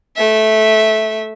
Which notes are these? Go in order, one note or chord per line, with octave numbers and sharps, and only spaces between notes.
A3 E5